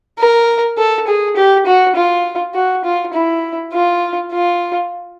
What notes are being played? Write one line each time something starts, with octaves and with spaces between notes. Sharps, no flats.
A#4
A4
G#4
G4
F#4
F4
F#4
F4
E4
F4
F4